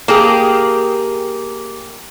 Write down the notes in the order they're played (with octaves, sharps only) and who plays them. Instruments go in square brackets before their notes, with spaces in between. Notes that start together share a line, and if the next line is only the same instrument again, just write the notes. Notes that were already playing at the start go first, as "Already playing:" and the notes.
[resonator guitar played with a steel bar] A#3 G4 G#4